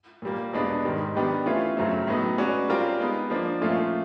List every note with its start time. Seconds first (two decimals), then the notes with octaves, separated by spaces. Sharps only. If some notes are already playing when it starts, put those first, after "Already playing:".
0.22 A#2 G3 A#3
0.53 E2 B2 G#3 B3 D4
0.85 G#2 D#3 G3
1.15 D#3 G3 B3 D4 G4
1.46 E3 A3 C#4 F4
1.77 F#2 C#3 F#3 A3 C4
2.07 A2 F#3 B3 D#4
2.38 G#3 C#4 F#4 B4 D5
2.68 G3 C4 F4 A#4 D5
3.00 G#3 B3 D#4
3.30 F3 A#3 D4
3.61 A#2 F3 A3 C#4 F4